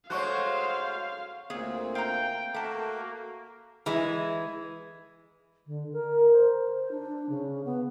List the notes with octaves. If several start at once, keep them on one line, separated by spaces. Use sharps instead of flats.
G#3 A3 F#4 C5 C#5 F5 C#6 F#6
D2 A#2 A#3 C4 G#4
F5 G5 A#5
A3 A#3 F#4 A5
E3 G#3
D3
A#4
C5
D4
C#3
B3